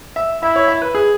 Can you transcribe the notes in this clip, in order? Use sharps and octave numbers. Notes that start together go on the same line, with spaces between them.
E5
E4 E5
C#5
E5
B4
G#4